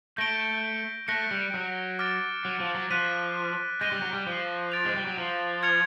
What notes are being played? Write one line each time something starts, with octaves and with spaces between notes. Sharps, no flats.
A3 G6 A#6 D7 G7
A3 F#6 A#6 C#7
G3
F#3
D6 F6 A6 D7
F#3
F3
F#3
F3 F#6 B6 D#7
G#3 G6 A#6 D#7 G7
G3
F#3
G3
F3
A6 D7 F7
G#3
G3
F#3
F3
F6 G#6 C#7 F7